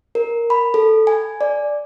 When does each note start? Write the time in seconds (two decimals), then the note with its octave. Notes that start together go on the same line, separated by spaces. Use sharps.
0.15 A#4
0.50 B5
0.74 A4
1.07 G#5
1.41 D5